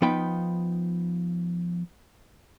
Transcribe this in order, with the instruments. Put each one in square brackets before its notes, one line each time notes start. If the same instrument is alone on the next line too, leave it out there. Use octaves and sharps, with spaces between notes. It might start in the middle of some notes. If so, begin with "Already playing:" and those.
[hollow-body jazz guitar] F3 B3 D#4 G5 B5